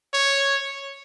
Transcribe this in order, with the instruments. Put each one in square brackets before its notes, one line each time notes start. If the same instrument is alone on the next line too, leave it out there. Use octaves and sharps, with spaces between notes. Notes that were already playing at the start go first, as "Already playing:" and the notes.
[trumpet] C#5